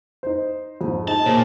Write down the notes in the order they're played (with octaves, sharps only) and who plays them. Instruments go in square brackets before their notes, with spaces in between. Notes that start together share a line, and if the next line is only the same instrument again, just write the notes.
[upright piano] D#4 C5
F2 G#2
[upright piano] D#4 G#4 [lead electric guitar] A5
[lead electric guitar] A#2 [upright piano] C5 C#5